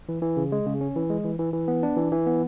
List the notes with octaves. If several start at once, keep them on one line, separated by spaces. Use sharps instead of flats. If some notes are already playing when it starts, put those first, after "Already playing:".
E3
E3
C#3
G#3
C#3
C#4
E3
G#3
E3
E3
E3
B3
D4
E3
E3
B3